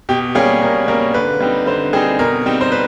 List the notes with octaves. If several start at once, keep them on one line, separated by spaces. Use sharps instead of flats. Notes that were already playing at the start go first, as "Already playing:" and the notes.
B2 G4
G3 A#3 C#4 G#4
B2 A#4
G3 A#3 C#4 A#4
D3 B4
G3 C4 D#4
D3 C5
G3 C4 D#4 G#4
B2 A#4
G3 C4 D#4
C5
B4